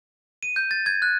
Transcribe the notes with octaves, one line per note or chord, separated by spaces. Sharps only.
D#7
G6
A6
G#6
F#6